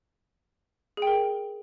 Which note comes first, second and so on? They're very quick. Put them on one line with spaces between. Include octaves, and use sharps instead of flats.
G#4 G5 A#4